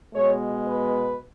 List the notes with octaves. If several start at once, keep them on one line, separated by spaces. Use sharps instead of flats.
B2 G#3 B3 C#5
B4